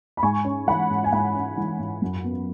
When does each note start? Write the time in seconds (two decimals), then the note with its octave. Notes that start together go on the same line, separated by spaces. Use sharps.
0.17 B5
0.23 G#2 G#5 C#6
0.45 C#4
0.67 E3 F#5 B5
0.90 G#2
1.04 G#5
1.12 G#2 F#5 B5
1.35 C#4
1.57 E3
1.79 G#2
2.02 F#2
2.24 B3